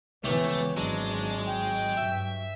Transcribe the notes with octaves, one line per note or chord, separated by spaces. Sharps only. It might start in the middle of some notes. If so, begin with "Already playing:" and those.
C#2 E3 A3 B3 G4 C#5
G#1 F#3 G#3 D4
G5
G2 E5